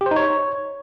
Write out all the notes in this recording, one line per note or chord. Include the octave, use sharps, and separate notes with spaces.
G4
C5
D#4
C#5